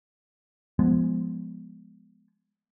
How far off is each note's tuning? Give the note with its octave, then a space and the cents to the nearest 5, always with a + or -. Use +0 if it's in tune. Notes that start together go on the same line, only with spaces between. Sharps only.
F3 +0 G#3 +0 B3 +0